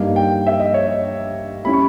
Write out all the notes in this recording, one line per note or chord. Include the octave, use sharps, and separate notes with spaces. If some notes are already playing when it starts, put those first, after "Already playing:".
Already playing: G2 G3 A#3 D#4
G5
E5
D#5
C#5
D#5
G3 C#4 E4 B5
C#6